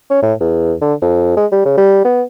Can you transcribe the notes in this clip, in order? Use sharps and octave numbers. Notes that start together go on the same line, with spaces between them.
C#4
A2
E2
D3
F2
G#3
G3
C#3
G3
B3